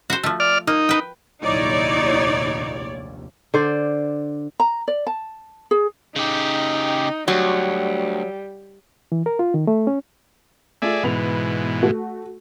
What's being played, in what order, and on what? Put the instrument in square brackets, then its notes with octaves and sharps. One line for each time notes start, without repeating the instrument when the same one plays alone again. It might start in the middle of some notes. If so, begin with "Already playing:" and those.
[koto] F#4 C5
F3 A3
[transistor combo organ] D5 F6
[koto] A#3 [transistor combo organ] D#4
[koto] B4 G5
[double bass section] F1 A#1 D#2 [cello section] F#3 D#4 E4 [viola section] C#5 D5
[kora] D3 C5 D5
[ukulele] A#5
D5
A5
G#4
[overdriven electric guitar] C#3 G4 [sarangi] D#4
[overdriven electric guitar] D2 [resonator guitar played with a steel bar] F#3 [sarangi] G3
[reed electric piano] E3
A#4
F4
D#3
A3
C#4
[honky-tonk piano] A3 F4 [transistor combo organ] G#4 D5 E5
[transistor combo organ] G#2 B2 E3 [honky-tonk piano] B3 B5 F7
[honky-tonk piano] A3 F#4